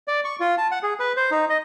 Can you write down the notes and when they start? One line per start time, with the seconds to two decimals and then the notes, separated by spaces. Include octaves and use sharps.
0.08 D5
0.25 C#6
0.40 F4
0.58 A5
0.71 F#5
0.83 G#4
1.00 B4
1.17 C5
1.31 D#4
1.49 D#5